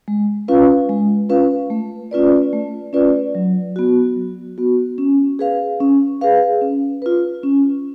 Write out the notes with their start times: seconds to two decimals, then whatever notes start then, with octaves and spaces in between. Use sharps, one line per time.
0.08 G#3
0.48 C#4 F4 B4 F5
0.89 G#3
1.29 C#4 F4 B4 F5
1.70 A3
2.11 C#4 F4 B4 D5
2.53 A3
2.93 C#4 F4 B4 D5
3.35 F#3
3.76 B3 F#4
4.16 F#3
4.58 B3 F#4
4.98 C#4
5.39 G#4 B4 F5
5.80 C#4
6.21 G#4 B4 F5
6.61 C#4
7.02 F4 B4
7.43 C#4